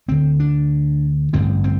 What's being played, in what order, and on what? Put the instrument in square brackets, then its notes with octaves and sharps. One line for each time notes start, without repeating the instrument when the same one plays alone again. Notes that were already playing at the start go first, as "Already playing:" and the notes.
[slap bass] D2 D3 C4
D4
A1 G2 D3 C4
C4